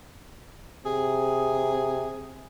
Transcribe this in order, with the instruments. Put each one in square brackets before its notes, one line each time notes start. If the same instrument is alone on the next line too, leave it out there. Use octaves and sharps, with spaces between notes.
[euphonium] C3 [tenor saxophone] G#4